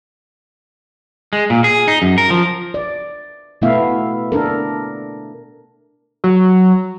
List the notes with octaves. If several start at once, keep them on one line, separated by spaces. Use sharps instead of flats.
G#3
A#2
G#4
D#4
F#2
A#4
F3
D5
B2 A3 B3 E4 E5 F5
D4 A4 A#4
F#3